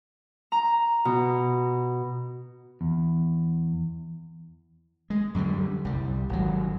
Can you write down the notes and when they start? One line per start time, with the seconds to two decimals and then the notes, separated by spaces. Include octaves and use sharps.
0.52 A#5
1.05 B2
2.81 E2
5.10 G#3
5.35 F#2 D3 E3 G3
5.85 C2 G3
6.29 G#1 F#3